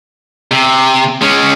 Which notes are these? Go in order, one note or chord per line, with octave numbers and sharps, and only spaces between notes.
C3
G#3 C#4